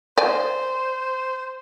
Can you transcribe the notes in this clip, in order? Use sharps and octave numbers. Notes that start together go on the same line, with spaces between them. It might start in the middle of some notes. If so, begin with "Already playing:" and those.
C5 D5 G#5